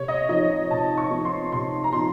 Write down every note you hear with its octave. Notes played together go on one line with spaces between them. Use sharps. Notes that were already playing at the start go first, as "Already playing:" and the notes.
Already playing: C3 C#5
D#5
F3 C4 D#4 D#5
C3 A5
C#6
F3 C4 D#4
C6
C3 C6
A#5
F3 C4 D#4 C6